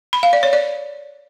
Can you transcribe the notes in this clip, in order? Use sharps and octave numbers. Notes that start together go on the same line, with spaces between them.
B5
F5
D5
C#5
D5